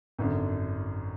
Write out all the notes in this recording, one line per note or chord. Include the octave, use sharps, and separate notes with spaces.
G#1 F#2 D3